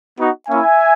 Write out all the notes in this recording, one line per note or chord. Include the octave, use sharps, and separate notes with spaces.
B3 D#4 F#4
A#3 C#4 E4 E5 G#5